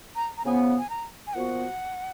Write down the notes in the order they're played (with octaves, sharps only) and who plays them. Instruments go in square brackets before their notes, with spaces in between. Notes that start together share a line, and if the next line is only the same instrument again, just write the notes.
[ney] A#5
A#5
[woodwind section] C#3 F3 B3 [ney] G#5
[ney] G#5
A#5
G#5
[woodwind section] A#2 F3 B3 F#4 [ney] F#5